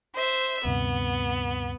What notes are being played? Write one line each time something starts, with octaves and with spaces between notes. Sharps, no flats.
C5 E5
D2 G2 C3 B3